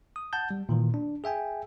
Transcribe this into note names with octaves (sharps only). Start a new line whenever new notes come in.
D#6
F#5 A5 G6
G3
A#2 D#3 E3
D4
G#4 E5 G5 G#5